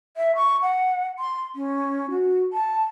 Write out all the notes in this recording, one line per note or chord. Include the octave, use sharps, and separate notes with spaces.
E5
C#6
F#5
C6
C#4
F#4
A5